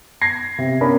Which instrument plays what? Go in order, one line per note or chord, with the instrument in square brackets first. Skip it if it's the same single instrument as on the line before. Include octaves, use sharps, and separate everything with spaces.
[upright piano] G#6 A#6 C7
C3
B3 C#4 D4 A#4 B4 B5